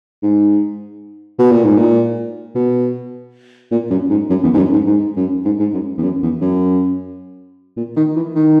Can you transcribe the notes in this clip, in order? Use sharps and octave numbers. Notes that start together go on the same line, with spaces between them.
G#2
B2
A#2
G#2
A#2
B2
A#2
F#2
G#2
F#2
E2
G#2
F#2
G#2
G#2
F#2
G#2
G#2
F#2
E2
F#2
E2
F#2
A#2
D#3
E3
D#3